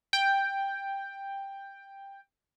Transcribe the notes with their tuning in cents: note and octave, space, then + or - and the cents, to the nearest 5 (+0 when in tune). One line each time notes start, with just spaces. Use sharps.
G5 +10